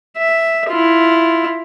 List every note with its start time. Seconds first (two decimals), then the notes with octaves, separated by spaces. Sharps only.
0.17 E5
0.69 E4 F4